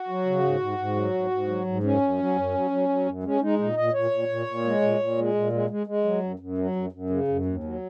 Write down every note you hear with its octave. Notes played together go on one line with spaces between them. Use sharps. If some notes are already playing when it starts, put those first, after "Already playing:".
Already playing: F#4
F#3
C#3
G#2
G#2
G#2
F#3
G#2
G#2
F#3
G#2
F#2 C#4
F#2
F#3
F#2
F#3
F#3
F#3
F#2
G#3 C#4
G#3 D#4
A#2 D#4
A#2 D#5
A#2 C#5
A#2
A#2
A#2
G#3
A#2
A#2
G#3
A#2
G#3
G#3
G#3
F#3
F#2
F#2
F#3
F#2
F#2
C#3
F#2
D#2
F#3